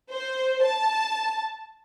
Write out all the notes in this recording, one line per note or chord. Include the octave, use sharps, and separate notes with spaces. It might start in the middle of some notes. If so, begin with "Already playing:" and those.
C5
A5